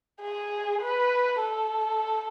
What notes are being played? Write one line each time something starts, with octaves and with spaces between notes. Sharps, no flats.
G#4
B4
A4